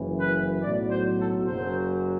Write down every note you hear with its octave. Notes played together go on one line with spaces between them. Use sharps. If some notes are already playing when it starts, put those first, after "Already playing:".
Already playing: F#1 F#2 E3
B4
B1 A2 F#3 D5
C5
A4
F#1 F#2 F#3 C5